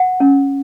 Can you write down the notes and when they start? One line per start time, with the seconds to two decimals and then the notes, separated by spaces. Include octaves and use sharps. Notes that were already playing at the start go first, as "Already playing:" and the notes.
Already playing: F#5
0.20 C#4